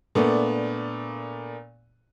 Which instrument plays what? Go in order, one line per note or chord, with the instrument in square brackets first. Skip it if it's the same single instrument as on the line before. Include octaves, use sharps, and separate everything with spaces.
[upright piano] A#2 A3 B3 D4